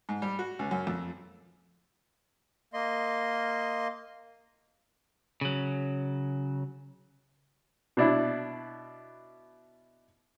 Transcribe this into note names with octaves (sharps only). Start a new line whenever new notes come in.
G#2
G3
F#4
C#2
F#2
F2
A#3 D#5 C6
C#3 F#3
B2 D4 E4